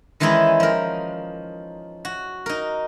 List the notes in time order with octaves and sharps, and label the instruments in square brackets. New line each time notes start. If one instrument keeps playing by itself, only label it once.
[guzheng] D#3 E3 G#3 C#4 D#4 E4
F3 A#4
F#4
D#4 A#4